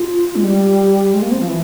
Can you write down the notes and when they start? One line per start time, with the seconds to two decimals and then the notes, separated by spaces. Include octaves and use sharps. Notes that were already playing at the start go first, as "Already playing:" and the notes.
Already playing: F4
0.36 G#3
0.44 G3
1.14 G#3
1.22 A#3
1.31 C4
1.40 F3
1.48 E3